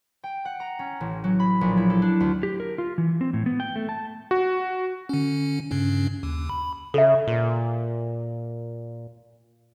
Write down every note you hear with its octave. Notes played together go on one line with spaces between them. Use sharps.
G5
F#5
A#5
C#4
A1
F#3
B5
A#1
E4
A4
D4
D2
G4
A#4
F4
E3
C4
A2
B3
G5
A3
A5
F#4
D3 C#4
G2 C#3 C#4
D#2
B5
C#3 A4 E5
A#2